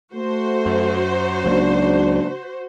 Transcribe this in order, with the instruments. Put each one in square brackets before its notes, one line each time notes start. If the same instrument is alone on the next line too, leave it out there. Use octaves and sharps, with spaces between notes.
[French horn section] A3 [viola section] F#4 C5
[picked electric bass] F#2
[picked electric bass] C#2 F#3 A#3 [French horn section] G#2 C#3 D4